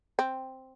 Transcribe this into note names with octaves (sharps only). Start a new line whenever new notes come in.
C4